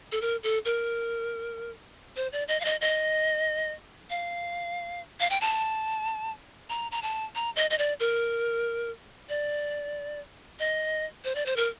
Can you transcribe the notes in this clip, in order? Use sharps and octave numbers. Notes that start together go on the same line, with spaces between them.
A4
A#4
A4
A#4
C5
D5
D#5
F5
D#5
D#5
F5
F5
G5
A5
A#5
A#5
A5
A#5
D#5
D#5
D5
A#4
D5
D#5
C5
D5
C5
A#4